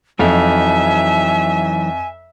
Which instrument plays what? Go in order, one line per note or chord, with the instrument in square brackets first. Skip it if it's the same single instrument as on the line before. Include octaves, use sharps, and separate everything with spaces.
[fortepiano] F2 [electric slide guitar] E3 F#3 D#4 [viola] E5 [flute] G#5